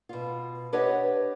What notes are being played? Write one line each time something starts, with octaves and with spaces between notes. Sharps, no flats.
B2 F4
D4 G4 B4 C#5 D#5 F#5